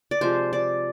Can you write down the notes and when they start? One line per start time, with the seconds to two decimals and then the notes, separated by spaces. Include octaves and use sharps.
0.11 D5
0.21 C3 F3 G#3 C5
0.53 D5